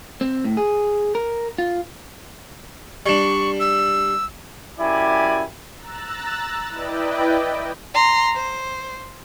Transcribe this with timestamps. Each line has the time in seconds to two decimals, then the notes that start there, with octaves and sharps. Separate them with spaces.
0.21 C4
0.44 A2
0.57 G#4
1.15 A#4
1.58 F4
3.06 G3 D4 C#6
3.60 E6
4.79 F#2 E4 G4 D5 G#5
5.76 A#5 E6 F#6 A6
6.70 E4 B4 D5 D#5 G5
7.94 A#5 C6
8.35 C5